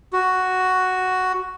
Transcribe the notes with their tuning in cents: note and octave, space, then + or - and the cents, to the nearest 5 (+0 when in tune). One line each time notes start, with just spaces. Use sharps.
F#4 +0